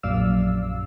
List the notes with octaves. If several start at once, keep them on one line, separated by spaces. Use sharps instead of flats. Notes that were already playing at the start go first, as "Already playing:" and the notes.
A#1 F#2 D5 F5 E6